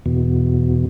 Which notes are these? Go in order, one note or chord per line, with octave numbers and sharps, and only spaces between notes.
E2 B2